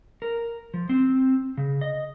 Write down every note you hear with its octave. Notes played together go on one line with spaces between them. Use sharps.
A#4
F3
C4
C#3
D#5